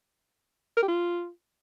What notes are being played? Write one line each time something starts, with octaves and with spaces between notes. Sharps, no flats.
A#4
G4
F4